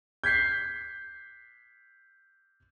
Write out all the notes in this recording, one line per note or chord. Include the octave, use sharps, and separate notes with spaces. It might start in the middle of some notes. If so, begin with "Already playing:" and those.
G6 G#6 B6 C7